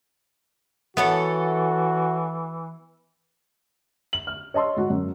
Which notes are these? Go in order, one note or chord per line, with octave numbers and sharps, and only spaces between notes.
E3 B3 E4 F#4 A4 C#5
F#7
F6
C#5 D#5 A5 C6 E6
G#2 F#4
F#2